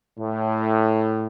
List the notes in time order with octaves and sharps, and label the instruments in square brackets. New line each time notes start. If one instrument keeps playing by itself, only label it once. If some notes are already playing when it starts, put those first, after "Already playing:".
[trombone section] A2